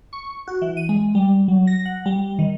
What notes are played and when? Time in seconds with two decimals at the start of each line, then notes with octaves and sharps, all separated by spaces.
0.13 C#6
0.48 F#4
0.62 E3
0.77 D#7
0.89 G#3
1.15 G3
1.48 F#3
1.67 A#6
1.85 F#5
2.06 G3
2.39 D#3